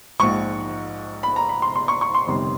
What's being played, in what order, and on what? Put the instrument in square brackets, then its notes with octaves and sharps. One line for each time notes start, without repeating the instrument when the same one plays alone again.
[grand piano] A#1 G#2 F3 C#6
B5
A#5
B5
C6
C6
C#6
C#6
C6
G1 F2 C3 D#3 G3